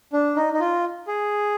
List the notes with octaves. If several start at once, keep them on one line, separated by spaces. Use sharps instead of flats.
D4
D#4
D#4
F4
G#4